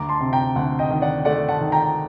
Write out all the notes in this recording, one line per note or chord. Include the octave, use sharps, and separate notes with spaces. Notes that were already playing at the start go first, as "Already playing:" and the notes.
Already playing: D2 A#5 D6
A5 C6
C3
G5 A#5
D2 F#5 A5
D#5 G5
D#3
D5 F#5
A3 D5 F#5
F#5 A5
D#3
G5 A#5